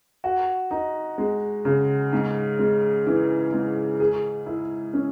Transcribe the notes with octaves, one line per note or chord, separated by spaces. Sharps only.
F#4
D#4
G#3
C#3
G#2
G#3
E3
G#2
G#4
E4
C#4